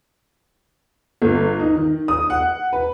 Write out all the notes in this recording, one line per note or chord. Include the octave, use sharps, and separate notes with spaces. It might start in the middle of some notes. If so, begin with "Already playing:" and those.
G1
D#4
D#3
D#6
F#5
B4